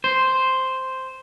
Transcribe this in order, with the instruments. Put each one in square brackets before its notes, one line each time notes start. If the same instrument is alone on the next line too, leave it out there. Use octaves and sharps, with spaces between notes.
[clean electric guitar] C5